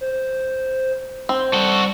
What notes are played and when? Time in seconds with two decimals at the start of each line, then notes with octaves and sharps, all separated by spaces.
0.01 C5
1.29 C4 C6
1.54 G3 F#4 A4